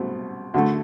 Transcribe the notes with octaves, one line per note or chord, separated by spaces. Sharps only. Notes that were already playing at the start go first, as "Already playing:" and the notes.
Already playing: C2 B2 A3 C4
D2 D3 A3